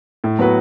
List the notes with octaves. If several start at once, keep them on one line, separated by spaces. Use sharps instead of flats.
A2
F#3 B3 F#4 B4